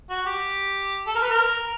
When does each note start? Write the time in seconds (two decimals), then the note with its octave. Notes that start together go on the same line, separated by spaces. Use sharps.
0.10 F#4
0.26 G4
1.07 A4
1.15 A#4
1.22 B4
1.30 A#4